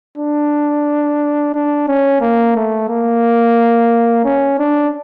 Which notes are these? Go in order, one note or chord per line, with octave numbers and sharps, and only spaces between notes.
D4
D4
C#4
A#3
A3
A#3
C#4
D4